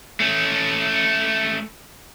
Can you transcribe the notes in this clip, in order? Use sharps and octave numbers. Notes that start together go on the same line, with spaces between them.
A3 C#4